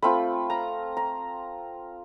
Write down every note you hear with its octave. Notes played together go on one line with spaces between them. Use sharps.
A3 C4 F4 B5
A#5
A#5